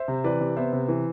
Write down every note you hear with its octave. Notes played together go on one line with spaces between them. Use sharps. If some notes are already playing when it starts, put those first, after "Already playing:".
Already playing: C5 E5
C3
E3 B4 D5
C3
B3 C5 E5
C3
E3